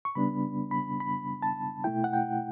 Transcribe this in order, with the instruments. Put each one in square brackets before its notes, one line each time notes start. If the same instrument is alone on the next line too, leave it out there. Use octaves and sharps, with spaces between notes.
[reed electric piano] C#6
C#3 G3 B3 D4 B5
B5
B5
A5
B2 A3 E4 G5
F#5
G5